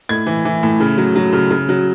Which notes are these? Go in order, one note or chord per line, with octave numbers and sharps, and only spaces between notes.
A2 G#6
E3
E3
A2
C#3
F#3
F#3
C#3
C#3
F#3